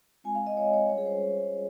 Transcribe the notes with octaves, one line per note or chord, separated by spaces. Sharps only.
G#3 C4 F4 G#5
F5
D#5
C#5
C#5
G3 C#4 F4 C#5
G#4
C5